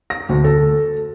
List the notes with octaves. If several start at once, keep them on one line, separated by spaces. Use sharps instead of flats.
A#6
D2
A4